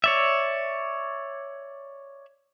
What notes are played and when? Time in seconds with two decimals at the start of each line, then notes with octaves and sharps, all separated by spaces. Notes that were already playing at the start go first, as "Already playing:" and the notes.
0.04 C#5 D5 E5